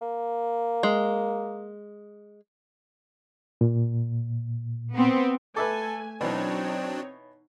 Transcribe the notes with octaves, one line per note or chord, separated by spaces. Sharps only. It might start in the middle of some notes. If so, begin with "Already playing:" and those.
A#3
G#3
A#2
B3 C4
A3 A4 B4 E5 G#5 D6
B2 E3 F#3 C4 D4 D#4 C#5